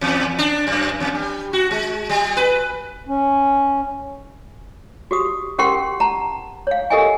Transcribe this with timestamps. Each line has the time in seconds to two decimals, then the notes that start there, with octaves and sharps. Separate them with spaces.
0.01 E2
0.39 D4
0.67 F#2
1.00 E2
1.15 G3
1.53 F#4
1.71 G#3
2.09 G3
2.37 B4
3.08 C#4
5.11 F#4 G4 D#6
5.58 C#4 G4 A#4 F#5 G5 C6
6.00 F#5 A5 A#5
6.67 C#5 F5
6.90 G4 A4 A#4 D#5 E5 G#5